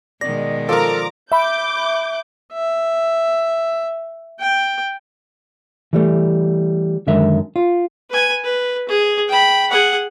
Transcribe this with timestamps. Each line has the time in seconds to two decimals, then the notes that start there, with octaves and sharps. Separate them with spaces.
0.21 B2 D#3 G#3 D5 A#6
0.69 F3 A4 A#4 A#5 D6
1.32 E5 B5 D6 G6
2.53 E5
4.40 G5
5.93 E3 G3 A3
7.07 F#2 D3 D#3 G#3 A#4 E5
7.56 F4
8.10 B4 G#5
8.44 B4
8.88 G#4
9.28 G5 B5
9.70 G#4 F#5